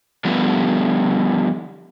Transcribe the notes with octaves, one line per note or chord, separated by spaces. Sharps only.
D3 F3 G3 B3